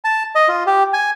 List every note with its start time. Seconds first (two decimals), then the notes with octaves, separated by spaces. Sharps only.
0.05 A5
0.35 D#5
0.48 F4
0.66 G4
0.93 G#5